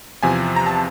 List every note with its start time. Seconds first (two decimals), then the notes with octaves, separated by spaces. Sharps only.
0.23 E2 C3 F3 G#5
0.56 A#5
0.67 A5